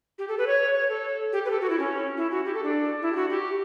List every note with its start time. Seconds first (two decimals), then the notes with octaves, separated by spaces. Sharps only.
0.19 G4
0.28 A4
0.38 B4
0.47 C#5
0.75 C#5
0.89 A4
1.33 G4
1.45 B4
1.50 A4
1.61 F#4
1.70 E4
1.79 C#4
2.17 E4
2.31 F#4
2.45 G4
2.54 A4
2.64 D4
3.02 E4
3.12 G4
3.16 F#4
3.30 G4